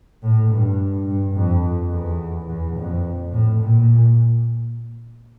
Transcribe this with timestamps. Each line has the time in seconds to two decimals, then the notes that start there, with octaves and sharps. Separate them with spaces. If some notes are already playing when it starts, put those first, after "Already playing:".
0.23 A2
0.51 G2
1.07 G2
1.35 F2
1.92 E2
2.48 E2
2.76 F2
3.32 A2
3.60 A#2